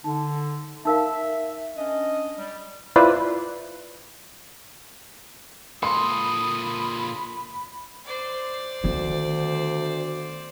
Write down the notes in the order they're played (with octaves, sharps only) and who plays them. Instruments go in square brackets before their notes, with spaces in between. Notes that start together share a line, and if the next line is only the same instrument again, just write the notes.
[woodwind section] D3 [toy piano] D#4
[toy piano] D#4 A#4 F5 [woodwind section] E5
[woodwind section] C#4 D4 D#5
G3
[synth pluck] E4 F4 B4 C5 D5
[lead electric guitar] A#2 A4 [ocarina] B5 [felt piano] C6 [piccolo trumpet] D#6
[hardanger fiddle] C5 D5
[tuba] D2 [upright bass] D#3 B3